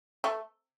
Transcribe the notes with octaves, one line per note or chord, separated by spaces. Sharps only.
A3